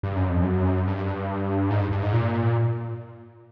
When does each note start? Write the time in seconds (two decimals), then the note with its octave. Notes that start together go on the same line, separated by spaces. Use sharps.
0.03 G2
0.16 F#2
0.30 F2
0.43 F#2
0.87 G2
1.70 G#2
1.81 G2
1.92 G2
2.02 G#2
2.13 A#2